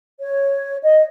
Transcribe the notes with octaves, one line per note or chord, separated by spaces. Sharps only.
C#5
D#5